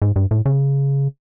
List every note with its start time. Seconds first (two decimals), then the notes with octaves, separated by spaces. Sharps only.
0.02 G#2
0.16 G2
0.31 A2
0.46 C#3